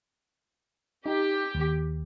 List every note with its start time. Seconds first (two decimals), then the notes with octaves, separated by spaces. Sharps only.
1.06 D#4 G4
1.54 D#2